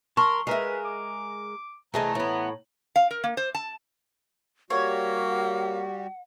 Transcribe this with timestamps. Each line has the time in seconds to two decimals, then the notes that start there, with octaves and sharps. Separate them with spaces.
0.17 A#4 A5 C6 C#6
0.47 G#3 A#4 B4 E5 F5
0.84 D6
1.94 C2 E3 A3 G#4 D#5 A5 A#5
2.15 A2 E3 B3
2.96 F5
3.11 A#4
3.24 A#3
3.37 C5
3.55 A5
4.70 G3 A#3 F#4 G4 C#5 F#5